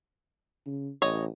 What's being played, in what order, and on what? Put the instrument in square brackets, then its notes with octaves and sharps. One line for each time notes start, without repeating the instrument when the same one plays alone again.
[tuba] C#3
[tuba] A1 [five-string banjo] C#5 D#5